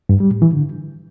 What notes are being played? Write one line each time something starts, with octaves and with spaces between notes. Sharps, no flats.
G2
G3
A2
E3
D3